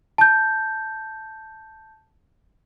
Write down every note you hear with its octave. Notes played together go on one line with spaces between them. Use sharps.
A5 G6